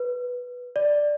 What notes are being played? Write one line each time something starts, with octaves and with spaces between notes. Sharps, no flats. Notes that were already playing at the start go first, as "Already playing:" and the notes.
Already playing: B4
D5